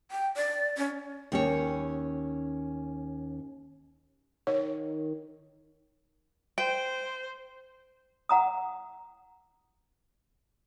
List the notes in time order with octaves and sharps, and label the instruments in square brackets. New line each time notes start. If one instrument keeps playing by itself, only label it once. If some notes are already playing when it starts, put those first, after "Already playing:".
[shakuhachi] G5
D5
C#4
[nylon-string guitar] D#2 C#4 C#5
[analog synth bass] D#3 [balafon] C#5
[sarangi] C5 [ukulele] G5
[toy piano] F#5 A#5 D#6